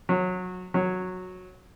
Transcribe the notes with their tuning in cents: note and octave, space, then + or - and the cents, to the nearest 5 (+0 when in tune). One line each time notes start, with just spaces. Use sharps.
F#3 -20
F#3 -10